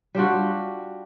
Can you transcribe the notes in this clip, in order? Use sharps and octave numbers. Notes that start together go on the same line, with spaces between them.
G3 D4 F4 F#4